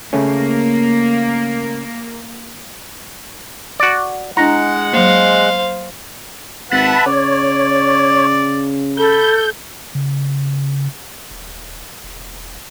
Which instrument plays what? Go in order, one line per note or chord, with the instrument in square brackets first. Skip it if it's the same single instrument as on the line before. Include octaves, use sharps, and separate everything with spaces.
[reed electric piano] C#3 A3 C#4 [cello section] A#3
[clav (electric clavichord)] F#4 D5
[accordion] G#3 F#5 [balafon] D4 E4 [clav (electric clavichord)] A#5
[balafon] F#3 A#3 [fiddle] C5 F5
[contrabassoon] G#1 [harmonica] B4 E5 F#5 [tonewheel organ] A5 B5
[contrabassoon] C#3 [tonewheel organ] C#5 [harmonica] D5
[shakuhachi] A4 [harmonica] B5 [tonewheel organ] G6
[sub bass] C#3
D#1
E1